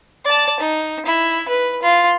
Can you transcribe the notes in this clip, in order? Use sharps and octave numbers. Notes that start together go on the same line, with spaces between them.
D5 A5
D#4
E4
B4
F4